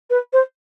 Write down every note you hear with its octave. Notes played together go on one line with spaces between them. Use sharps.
B4
C5